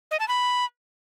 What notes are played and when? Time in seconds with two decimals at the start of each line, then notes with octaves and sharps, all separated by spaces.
0.11 D#5
0.20 A5
0.28 B5